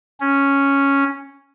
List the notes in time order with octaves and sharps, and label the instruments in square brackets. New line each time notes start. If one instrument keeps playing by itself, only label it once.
[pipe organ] C#4